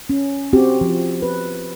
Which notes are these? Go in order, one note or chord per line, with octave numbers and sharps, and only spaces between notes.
C#4
C4 F#4 G4
F3
B4